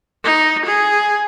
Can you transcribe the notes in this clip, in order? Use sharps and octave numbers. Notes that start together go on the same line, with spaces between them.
D#4
G#4